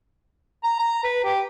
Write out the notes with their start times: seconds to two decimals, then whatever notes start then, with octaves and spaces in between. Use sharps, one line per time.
0.64 A#5
0.79 A#5
1.04 B4
1.24 G4